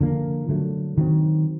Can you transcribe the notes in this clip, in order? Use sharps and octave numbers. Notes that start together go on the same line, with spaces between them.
D3 F3 A#3
D3 F#3 A3
D#3 F#3 A3 C4